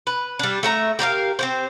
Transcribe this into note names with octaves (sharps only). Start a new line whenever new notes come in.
B4
G3 D4
A3 E5 A#5
G4 A#4 D5 F5
C4 G4 C5